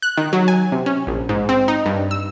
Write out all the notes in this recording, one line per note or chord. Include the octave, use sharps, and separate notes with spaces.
F#6
D#3
F#3
G#5
C3
C#4
A#1
G#2
C4
D#4
G2
E6